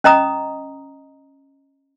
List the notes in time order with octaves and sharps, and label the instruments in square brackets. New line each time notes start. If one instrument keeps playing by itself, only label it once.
[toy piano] C#4 D#5 A#5 D#6